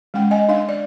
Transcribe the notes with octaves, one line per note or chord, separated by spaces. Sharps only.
G#3 C#4 F#5 G5
D#5 G#5
D4 F5
D5